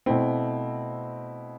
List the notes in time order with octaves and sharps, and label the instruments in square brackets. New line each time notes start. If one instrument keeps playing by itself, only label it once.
[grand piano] B2 A3 E4 [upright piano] C4